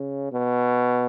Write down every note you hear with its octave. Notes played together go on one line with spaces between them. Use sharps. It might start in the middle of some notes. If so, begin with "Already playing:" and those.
Already playing: C#3
B2